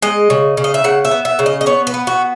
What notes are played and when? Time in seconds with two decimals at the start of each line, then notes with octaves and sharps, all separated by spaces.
0.02 G#3 D#5
0.30 C#3
0.57 C#3
0.64 D#5
0.74 E5
0.84 C#3 F#5
1.05 E5
1.11 B3
1.25 E5
1.39 C#3
1.46 D#5
1.61 D#5
1.66 B3 C#5
1.87 B4
1.94 B3
2.07 F#4